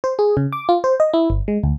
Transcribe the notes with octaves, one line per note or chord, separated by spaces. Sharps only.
C5
G#4
C#3
D6
F4
C5
D#5
E4
G1
G#3
D2